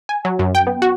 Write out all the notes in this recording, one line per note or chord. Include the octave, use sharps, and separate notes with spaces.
G#5
F#3
F#2
G5
B3
F#4